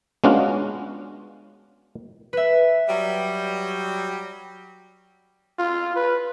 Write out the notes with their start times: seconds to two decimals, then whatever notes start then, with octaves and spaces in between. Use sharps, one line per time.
0.24 G#3 B3 C#4 D4 F4 F#4
2.33 B4 E5
2.88 F#3 G3
5.59 F4
5.96 B4